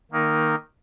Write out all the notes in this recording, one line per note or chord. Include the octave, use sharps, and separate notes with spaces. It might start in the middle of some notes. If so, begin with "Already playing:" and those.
D#3 A#3 D#4 A#4